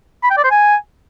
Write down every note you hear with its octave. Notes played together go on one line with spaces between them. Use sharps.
B5
G5
D5
C5
G#5